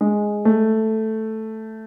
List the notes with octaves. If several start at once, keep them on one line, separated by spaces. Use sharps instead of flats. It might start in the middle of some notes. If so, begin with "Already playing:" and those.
G#3
A3